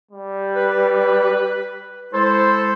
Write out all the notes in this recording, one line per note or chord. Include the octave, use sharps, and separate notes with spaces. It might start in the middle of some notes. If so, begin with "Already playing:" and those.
G3
B4
G#3 E4 A4 C5